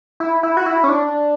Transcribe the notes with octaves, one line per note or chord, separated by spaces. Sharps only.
E4
E4
F#4
E4
C#4
D4